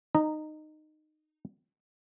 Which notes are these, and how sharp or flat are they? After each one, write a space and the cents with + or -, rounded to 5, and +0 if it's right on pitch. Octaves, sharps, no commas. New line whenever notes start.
D#4 -15 A#5 +0